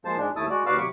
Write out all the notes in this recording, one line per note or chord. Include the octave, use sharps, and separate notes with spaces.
F3 G#3 A#3 C5 A5
G#2 G#3 D4
D#2 A3 E4 A5 D#6 E6
G#3 F#4 D5
D#2 F#4 B4 D5 F5 E6
C3 F#3 B5 C#6 D6